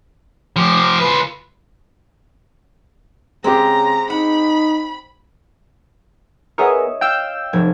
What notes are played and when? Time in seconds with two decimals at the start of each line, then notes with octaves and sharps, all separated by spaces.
0.56 F3 G4
1.00 F4 B4
3.44 C#3 G#3 C4 G4 A#5
4.10 D#4 F#5 B5
6.58 B3 G#4 A#4 C#5 D#5 E5
7.01 F5 G5 E6 G6
7.53 F1 G#6